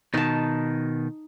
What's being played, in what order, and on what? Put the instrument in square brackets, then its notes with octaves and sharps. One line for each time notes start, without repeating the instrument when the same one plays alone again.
[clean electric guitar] B2 D#3 [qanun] D#4 A5